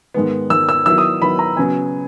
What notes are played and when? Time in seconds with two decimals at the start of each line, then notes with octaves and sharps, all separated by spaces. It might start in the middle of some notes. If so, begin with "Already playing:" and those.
0.14 G#2 D#3 G#3 B3
0.50 G#2 D#3 G#3 B3 E6
0.69 E6
0.86 D#3 F#3 B3 E4 E6
0.98 D#6
1.22 D#3 F#3 B3 E4 B5
1.39 A#5
1.57 C#3 F#3 B3 G#5